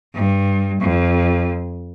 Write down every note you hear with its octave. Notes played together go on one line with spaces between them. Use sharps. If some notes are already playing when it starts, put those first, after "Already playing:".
G2
F2